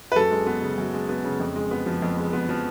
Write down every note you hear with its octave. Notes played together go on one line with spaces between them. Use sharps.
B4
F#2 A4
G#3
B3
C#3
F#2
G#3
B3
C#3
F2
G#3
B3
F3
F2
G#3
B3
F3